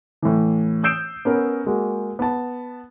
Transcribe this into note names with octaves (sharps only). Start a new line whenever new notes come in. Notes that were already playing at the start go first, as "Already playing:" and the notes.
A2 E3
D#6 E6 G6 C7 D7 E7
B3 C#4 A#4
G#3 A#3 F#4
B3 A5